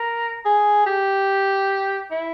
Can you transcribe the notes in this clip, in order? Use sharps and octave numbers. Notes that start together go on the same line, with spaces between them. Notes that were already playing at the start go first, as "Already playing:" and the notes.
Already playing: A#4
G#4
G4
E4